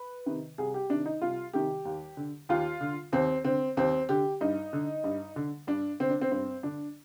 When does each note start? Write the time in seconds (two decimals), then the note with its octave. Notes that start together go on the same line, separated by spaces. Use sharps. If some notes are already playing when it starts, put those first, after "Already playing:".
Already playing: B4
0.26 C3 D#3
0.58 C2 G#4
0.74 G4
0.90 C3 D#3 D4
1.06 D#4
1.21 C2 F4
1.53 C3 D#3 G4
1.85 D#2
2.17 D3
2.49 D#2 F4
2.81 D3
3.12 D#2 C4
3.44 D3 C4
3.77 D#2 C4
4.09 D3 G4
4.41 G2 D#4
4.73 D3
5.04 G2
5.36 D3
5.67 G2 D4
6.00 D3 C4
6.10 D4
6.22 C4
6.32 G2 C4
6.63 D3 D4